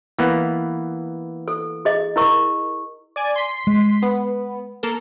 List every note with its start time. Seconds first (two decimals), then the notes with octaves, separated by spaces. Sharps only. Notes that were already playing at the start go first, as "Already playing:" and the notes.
0.19 E3 A#3 B3
1.48 A4
1.85 G#4 D#5
2.16 E4 A#4 C#6
3.16 D5 G#5
3.36 C6 B6
3.67 G#3
4.02 B3
4.83 A#3 A4 A#4